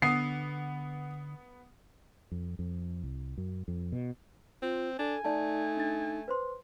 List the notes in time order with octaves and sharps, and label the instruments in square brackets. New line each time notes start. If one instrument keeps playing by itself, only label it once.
[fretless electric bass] D3 [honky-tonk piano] B3 [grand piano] D#6 C7
[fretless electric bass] F2
F2
C2
F#2
F2
B2
[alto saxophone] C4 [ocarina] F4
[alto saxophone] D4 [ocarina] A4 [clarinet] G#5
[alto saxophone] A3 [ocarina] D#4 [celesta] D5 A5
[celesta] D4 A6
B4 C5 C6